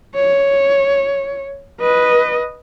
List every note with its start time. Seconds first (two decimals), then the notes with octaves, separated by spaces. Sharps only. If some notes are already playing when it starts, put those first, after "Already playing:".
0.15 C#5
1.81 B4 D#5